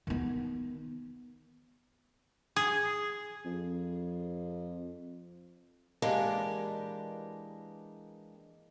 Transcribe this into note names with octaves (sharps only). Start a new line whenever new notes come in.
D#3 B3
G#4
F2
E3 G#3 A#3 D4 G4 B4